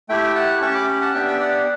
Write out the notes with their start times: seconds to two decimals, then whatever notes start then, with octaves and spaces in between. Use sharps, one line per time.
0.09 A3 E4 G4 E5 G5
0.35 F#5 A5
0.61 C#4 G4 A5 C#6
0.74 B5 D6
1.01 F#5 A5
1.13 B3 D4 G4 E5 G5
1.28 G5
1.40 D5 F#5